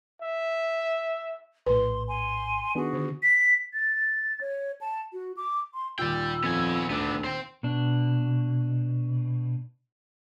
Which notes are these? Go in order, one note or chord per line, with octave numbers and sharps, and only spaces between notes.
E5
A#1 A2 B4 C6
G#5 C6
D#3 B3 D4 F#4 G#4
D3
B6
A6
C#5
A5
F#4
D6
C6
D#2 A#2 D5 G5 E6
F2 B3 G#5
D2 B3 D4
C5 G5
B2 D4